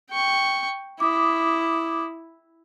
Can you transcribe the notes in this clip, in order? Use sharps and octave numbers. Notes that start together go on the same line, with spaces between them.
G5 C#6
E4 D6 D#6